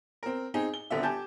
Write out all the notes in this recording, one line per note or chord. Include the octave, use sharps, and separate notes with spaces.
C4 A#4
C4 D#4 G#4
G7
D#1 D3 B3 C4 E5
G4 G#5 A5 G6